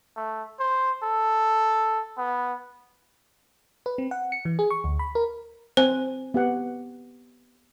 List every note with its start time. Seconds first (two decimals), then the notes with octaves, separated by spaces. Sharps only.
0.16 A3
0.59 C5
1.03 A4
2.18 B3
3.86 B4
3.98 C4
4.11 F#5
4.32 C#7
4.45 E3
4.59 G#4
4.71 C#6
4.84 D2
4.99 B5
5.15 A#4
5.77 C4 C5 G#5
6.34 B3 G4 F#5